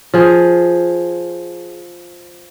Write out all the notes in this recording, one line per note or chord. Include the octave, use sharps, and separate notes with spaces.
F3 G#4